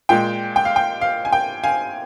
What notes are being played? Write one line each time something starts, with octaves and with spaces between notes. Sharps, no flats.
A#2 G#3 G5
G5
F5
G5
F5
G#5
G5
F5 G#5